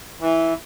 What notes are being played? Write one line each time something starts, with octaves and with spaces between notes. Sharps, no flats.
E3